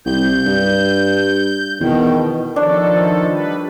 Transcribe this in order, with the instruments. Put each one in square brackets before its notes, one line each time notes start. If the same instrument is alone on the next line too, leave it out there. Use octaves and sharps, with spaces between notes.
[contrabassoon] C2 [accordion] G6
[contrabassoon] G2
[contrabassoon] E2 [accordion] B2 D#3
[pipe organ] D#3 F3 A4 [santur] D4 C#5
[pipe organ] G3 B4